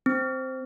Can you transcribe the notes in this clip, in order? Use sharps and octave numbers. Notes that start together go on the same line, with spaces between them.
C4